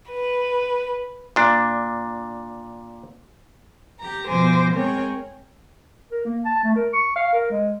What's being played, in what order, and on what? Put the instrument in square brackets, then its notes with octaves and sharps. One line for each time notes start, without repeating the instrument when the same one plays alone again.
[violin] B4
[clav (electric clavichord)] A#2 D4
[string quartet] G4 A#5
B2 F3 C5 G#5 D6 A#6
G#3 C4 G#4 A#4 C#5 G5
[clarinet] A#4
A#3
A5
A3
A#4
C#6
F5
A#4
G#3